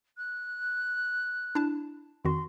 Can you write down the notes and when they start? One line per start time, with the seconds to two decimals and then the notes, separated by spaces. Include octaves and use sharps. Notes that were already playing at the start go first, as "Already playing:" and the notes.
0.17 F#6
1.55 D4 E4 A5
2.25 F2 D#3 F#4 C6